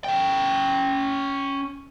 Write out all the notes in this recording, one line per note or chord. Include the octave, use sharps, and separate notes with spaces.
C#4 G5